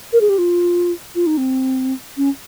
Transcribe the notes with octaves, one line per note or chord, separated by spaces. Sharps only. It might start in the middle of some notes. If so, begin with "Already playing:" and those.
A#4
G#4
G4
F4
F4
D#4
C4
C#4